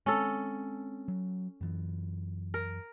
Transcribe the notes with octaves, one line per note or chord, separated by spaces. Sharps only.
G#3 C4 C#4 A4
F#3
F#2 E3
A#4